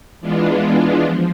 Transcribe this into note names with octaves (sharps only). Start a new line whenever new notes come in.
E3 G#3 B3 D4 F4
F3